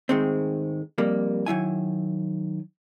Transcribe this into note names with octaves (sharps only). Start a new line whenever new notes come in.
G#2 D#3 G#3 A3 C4
F2 G3 A#3
D#3 F#3 E4 G#5